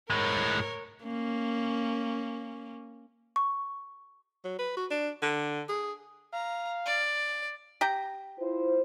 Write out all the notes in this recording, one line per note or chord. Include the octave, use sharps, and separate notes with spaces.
A2 G#3 A#4 C#5
A#3 C#4
C#6
F#3
B4
F#4
D4
D3
G#4
F5 A#5
D5
G4 G5 A#5
E4 F4 C5